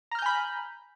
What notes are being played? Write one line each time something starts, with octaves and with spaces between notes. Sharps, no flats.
G#5 A#5 B5 F6 G6